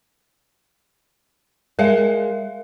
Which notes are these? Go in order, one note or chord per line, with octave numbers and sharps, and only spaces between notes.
G#3 A#4 E5 F5